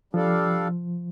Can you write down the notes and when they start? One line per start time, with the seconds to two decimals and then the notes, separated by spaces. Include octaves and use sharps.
0.13 F3 G3 D4 A4 D5 F5